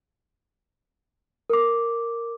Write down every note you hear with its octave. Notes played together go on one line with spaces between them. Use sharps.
A#4 D6